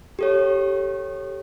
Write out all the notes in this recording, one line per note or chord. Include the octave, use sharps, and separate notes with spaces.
G4 A4 C#5